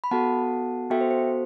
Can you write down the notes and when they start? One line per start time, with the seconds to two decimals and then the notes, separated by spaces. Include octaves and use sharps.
0.04 B5
0.11 B3 F#4 A4 F#5 A5
0.90 B3 F#4 A4 E5 G5
1.01 C5
1.11 C5